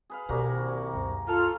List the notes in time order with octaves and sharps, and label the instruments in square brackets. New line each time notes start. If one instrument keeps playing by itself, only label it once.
[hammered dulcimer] G#4 B4 F5
[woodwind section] C2 [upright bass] B2 D#3 [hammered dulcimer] A#3 F#4
[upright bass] C#2 F#2
[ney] F4 [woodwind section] A4 F6